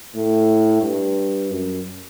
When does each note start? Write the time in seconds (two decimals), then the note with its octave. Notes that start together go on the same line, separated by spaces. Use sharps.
0.15 A2
0.82 G2
1.50 F#2